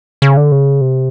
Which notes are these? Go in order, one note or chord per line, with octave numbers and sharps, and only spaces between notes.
C#3
D3
C#3
C3